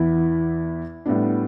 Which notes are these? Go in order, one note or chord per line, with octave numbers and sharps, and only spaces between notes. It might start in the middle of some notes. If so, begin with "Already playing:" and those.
Already playing: E2 E3 B3 E4
A2 G3 B3 D4